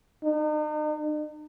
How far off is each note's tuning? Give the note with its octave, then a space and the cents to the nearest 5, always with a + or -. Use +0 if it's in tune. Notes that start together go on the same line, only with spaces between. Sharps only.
D#4 -40